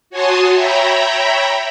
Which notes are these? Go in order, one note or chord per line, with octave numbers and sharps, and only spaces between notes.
F#4 C#5 G#5 A5 C6 D#6
C#5 E5 G5 A#5 B5